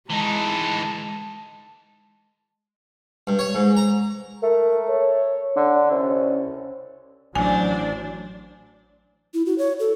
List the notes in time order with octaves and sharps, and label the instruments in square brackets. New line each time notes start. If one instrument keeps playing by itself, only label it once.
[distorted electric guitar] E3 D#4 [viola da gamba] G#3 [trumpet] A5
[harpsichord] G2
C#5
G#2
A#5
[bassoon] A3 [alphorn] A#4
[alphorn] C#5
[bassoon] D3 [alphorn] D4
[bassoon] C2 [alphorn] C#4
[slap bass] A1 [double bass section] F#3 [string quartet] D4 C5 D5 [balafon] G#5
[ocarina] E4
F#4
C#5
A4